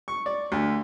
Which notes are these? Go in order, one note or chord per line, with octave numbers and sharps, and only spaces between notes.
C#6
D5
D2